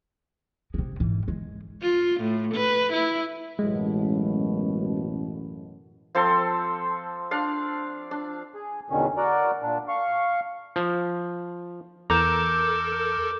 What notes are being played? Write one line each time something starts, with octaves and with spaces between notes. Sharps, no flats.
C3 G#3
G#2 E3
G#3
F4
A2
B4
E4
A1 F#2 B2 G#3
F3 C4 A4 C6
D4 D5 F5
D4
G#4
E2 B2 D3 D#3 C#4
F#4 A#4 D5
A#2 D4
F5 C#6
F3
E2 A4 A#4 A#5 D6 G6 E7